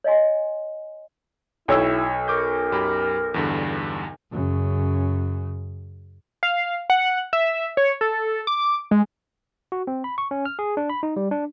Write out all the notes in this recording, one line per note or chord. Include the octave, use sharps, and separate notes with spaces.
C#5 D#5 F5 G#5 C6
B1 E4 C#5 G5 E6
A#4 C#6 D6 G6
F#2 G4 B5
E2 G2 D3
F#2 C#3
F5
F#5
E5
C#5
A4
D6
G#3
F#4
C4
B5
C#6
C#4
F6
G#4
D4
B5
D#4
G3
D4